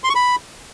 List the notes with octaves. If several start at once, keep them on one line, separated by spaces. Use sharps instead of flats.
C6
C#6
B5